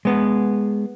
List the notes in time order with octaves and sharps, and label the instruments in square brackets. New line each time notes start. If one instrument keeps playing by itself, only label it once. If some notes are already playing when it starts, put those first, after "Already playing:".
[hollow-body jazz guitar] G#3 B3